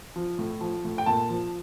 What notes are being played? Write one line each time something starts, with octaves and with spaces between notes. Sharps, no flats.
F3
A2
F3
A2
G5
A#2 A5
F3